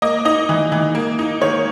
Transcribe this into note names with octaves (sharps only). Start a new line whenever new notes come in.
A#3 D#5
D#4 D#5
E3
E3
A#3
D#4
D#3 C#5